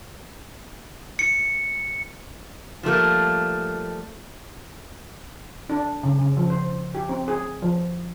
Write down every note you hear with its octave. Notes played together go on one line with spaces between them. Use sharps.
C#7
F3 G3 A3 A#3
D4
C#3
C#3
F3
C5
G4
C4
G#4
F3